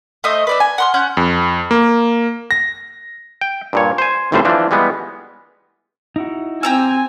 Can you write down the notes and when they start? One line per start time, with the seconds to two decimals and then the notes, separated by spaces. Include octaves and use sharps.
0.24 A3 C5 D#5 D#6
0.47 B4 D5 E5
0.60 G#5
0.78 F#5 C6 F6
0.94 C#4 F#5 G6
1.17 F2
1.71 A#3
2.51 A#6
3.41 G5
3.73 G2 A#2 C#5
3.98 C5 G#5
4.32 G#1 D2 A2 D3 G3 C5
4.45 E3 F3 D4
4.71 E3 G3 G#3 B3
6.16 D#4 E4 F#4
6.63 C4 G4 G#5 A#5 E6